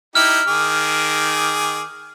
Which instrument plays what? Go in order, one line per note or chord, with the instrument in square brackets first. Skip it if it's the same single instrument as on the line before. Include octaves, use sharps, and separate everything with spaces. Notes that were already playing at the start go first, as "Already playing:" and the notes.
[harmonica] D#4 E4 G4 [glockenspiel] F6
[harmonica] D#3 G#4 D6